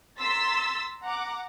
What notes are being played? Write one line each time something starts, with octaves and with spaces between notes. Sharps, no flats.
A#5 C6 E6 A6 B6
F#5 A#5 D6